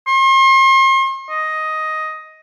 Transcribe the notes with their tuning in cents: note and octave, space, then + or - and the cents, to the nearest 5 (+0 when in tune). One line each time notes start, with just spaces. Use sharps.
C6 +40
D#5 +5